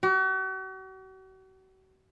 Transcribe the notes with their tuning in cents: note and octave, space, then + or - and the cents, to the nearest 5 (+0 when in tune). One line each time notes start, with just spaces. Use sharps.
F#4 +40